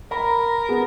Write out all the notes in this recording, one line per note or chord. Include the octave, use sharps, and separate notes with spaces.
A#4 A#5 B5
B3 G#4